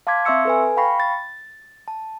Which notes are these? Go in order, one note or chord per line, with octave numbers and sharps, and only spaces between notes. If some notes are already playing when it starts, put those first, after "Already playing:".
F5 A5 C6 D6 G#6 B6
C4 E5 C6 C#6 E6 C#7
A4 B4 G#5
F5 G5 B5 C#6 A#6 C7
A6
A5